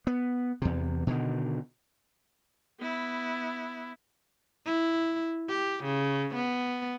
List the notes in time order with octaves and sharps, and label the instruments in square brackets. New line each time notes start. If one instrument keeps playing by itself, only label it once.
[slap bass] B3
E2 C3
B2 D3 D#3
[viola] B3 E4
[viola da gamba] E4
G4
C#3
B3